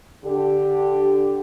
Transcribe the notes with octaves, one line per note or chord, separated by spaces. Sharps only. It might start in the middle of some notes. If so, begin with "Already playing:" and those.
D3 G4